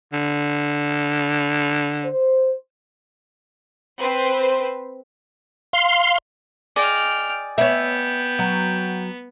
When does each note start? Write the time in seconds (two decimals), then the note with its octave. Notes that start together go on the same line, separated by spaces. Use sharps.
0.13 D3
2.04 C5
4.00 C4 B4 C5
5.73 F5 C6
6.76 G#4 D5 D#5 G5 F6
7.58 B3 C#5 E5 G5
8.39 F#3